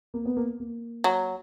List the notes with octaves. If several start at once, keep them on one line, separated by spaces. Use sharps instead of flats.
A#3
B3
A#3
A#3
F#3